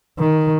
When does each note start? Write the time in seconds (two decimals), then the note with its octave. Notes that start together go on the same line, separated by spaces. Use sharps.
0.19 D#3